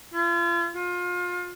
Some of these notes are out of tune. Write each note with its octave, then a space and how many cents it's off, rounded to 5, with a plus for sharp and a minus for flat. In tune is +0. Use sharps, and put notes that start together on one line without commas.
F4 -40
F4 +30